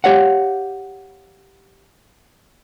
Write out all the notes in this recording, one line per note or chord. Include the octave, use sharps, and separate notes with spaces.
G4 C#5 F5 F#5